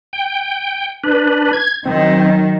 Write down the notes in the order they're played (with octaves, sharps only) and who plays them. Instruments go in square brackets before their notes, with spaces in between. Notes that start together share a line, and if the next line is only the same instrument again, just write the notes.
[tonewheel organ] G5
D4 B4
G#6
[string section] D#3 F#3 [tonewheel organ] C4